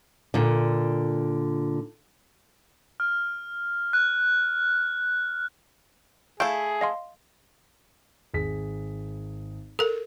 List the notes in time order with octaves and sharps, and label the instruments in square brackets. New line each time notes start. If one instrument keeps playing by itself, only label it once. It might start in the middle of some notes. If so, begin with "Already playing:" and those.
[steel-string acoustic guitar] A#2 D3
[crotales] F6
F#6
[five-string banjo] A3 E4 [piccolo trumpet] G#4 [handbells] F5 G6 D7
[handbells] D#5 F5 C6
[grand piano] G#1 G#4 B6
[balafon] A4 A#4